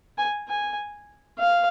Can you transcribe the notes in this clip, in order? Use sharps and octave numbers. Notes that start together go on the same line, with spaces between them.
G#5
G#5
F5